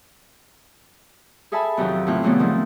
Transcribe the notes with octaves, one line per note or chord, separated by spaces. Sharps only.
G#4 A4 E5 G#5 A5 B5
F2 C3 D#3 F#3
A2 C#3 C4 F4 F#6
A#2 C#3 E3 F#3 A3 B3
D#3 F3 C4